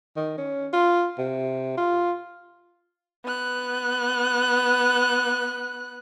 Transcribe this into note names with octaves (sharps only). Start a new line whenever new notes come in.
D#3
C#4
F4
C3
F4
B3 F#6